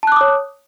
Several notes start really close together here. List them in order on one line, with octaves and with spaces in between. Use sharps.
A5 F#6 D6 D#6 C#5